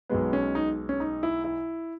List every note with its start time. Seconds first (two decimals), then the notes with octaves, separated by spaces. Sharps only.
0.09 B1 B2 G#3 B3
0.33 C#4
0.55 D#4
0.89 C#4
1.00 D#4
1.23 E4
1.44 E4